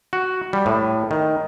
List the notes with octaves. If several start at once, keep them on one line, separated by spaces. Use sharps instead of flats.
F#4
G3
A2
D#3